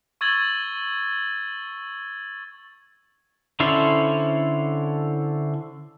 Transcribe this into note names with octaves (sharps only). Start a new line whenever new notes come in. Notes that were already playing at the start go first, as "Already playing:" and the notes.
C#6 E6 G#6 A6 F#7 G7
D3 C#4 E4 A4 C5